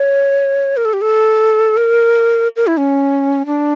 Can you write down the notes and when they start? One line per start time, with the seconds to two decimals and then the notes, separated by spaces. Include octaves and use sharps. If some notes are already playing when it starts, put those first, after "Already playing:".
Already playing: C#5
0.77 A#4
0.85 A4
0.93 G4
1.01 A4
1.77 A#4
2.56 A#4
2.67 E4
2.78 C#4
3.46 D4